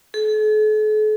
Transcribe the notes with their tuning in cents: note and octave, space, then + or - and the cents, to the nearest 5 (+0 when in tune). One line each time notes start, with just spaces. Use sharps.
A4 -45